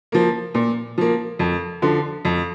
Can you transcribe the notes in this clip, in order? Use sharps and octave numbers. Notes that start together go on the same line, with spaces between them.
F3 A#3
A#2
F3 A#3
F2
D3 F3
F2